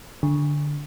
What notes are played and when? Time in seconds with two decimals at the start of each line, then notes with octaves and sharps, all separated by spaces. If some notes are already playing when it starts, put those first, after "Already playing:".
0.23 D3